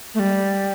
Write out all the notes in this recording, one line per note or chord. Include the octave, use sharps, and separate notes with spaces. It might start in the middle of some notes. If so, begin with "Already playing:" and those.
A3
G3